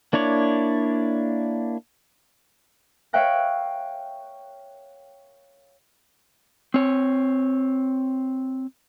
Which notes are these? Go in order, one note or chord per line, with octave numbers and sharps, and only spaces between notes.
A#3 D4 E4 C#5 D5
C#5 E5 F5 G5 F#6 A#6
C4 C#5